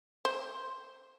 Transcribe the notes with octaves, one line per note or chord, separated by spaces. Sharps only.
C5